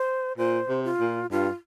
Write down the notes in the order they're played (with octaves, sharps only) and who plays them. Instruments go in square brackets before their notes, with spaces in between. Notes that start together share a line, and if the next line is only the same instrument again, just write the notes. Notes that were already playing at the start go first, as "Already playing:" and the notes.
Already playing: [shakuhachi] C5
[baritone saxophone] A#2 [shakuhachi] C5
[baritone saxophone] C3
[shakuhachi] F4
[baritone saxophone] A#2
[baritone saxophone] G2 [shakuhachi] F4